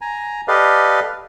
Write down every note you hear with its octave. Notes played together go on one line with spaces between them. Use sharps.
G#5 A#5
G4 A4 B4 D5 D#5 F5